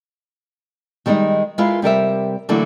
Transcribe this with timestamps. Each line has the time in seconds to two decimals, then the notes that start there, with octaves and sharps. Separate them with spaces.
1.06 D#3 G3 G#3 D4 D#4
1.58 G#3 E4 F4 A#4 B4
1.82 C3 G3 A#4 E5
2.49 D3 E3 F#3 A3 A#3